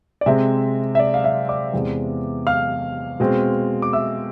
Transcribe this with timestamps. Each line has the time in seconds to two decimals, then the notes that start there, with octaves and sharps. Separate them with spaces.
0.21 D5
0.26 C3 G#3 C4 E5
0.95 E5
0.99 D5
1.14 F5
1.24 E5
1.49 D5 D6
1.73 E2 C3 G#3 B3
2.47 F5 F6
3.20 B2 G#3 C4
3.82 D6
3.93 E5 E6